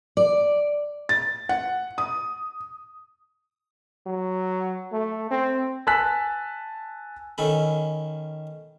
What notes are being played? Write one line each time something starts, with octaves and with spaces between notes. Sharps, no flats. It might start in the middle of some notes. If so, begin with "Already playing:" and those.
D5
A6
F#5
D#6
F#3
A3
C4
G#5 A5 E6 F#6 B6
D#3 C#4 A4 B5